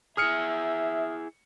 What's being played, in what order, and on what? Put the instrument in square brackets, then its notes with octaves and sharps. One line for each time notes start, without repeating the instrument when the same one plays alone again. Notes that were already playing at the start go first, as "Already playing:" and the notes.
[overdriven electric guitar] E4 G#4 [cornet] E5 [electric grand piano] D#6 F6 C#7